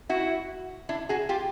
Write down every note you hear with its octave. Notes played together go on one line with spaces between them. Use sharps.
E4 F#4
D4 E4
F#4 G#4
F4 G4